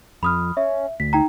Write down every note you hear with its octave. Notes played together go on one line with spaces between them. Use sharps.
F2 B5 D#6 F6
C#4 E5
D2 B6
D#4 G5 A#5